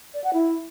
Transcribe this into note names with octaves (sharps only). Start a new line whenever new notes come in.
D5
F#5
E4